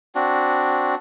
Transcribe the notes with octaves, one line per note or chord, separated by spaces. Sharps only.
C4 D4 F#4